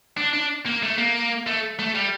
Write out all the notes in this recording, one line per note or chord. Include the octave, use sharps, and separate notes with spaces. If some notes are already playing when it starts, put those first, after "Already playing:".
D4
D4
A#3
A3
A#3
A3
A3
G3